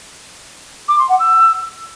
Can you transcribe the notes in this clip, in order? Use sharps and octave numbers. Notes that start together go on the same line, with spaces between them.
D6
C6
F#5
E6